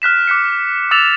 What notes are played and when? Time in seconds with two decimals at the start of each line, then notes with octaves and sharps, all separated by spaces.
0.02 F6 F#6 B6 E7
0.27 D6 F#6 B6 C#7
0.91 D6 E6 A6 E7 F7